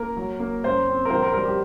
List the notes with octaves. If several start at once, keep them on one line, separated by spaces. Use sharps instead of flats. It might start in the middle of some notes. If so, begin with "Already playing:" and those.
Already playing: A#3 A#4
F#3
A#3
F#2 C5
C4
A#4
A#1 C5
A#4
G3 A#4
G4